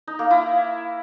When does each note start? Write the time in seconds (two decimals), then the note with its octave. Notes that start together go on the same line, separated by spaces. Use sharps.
0.07 D#4
0.19 A#3
0.31 E4